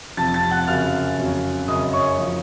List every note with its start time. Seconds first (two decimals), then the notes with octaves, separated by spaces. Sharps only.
0.17 F2 C3 F3 A5 A6
0.34 A5 A6
0.51 F#5 F#6
0.67 F#2 C#3 F#3 F5 F6
1.18 F2 C#3 F#3
1.68 F#2 C#3 F#3 D#5 D#6
1.93 C#5 C#6
2.19 F3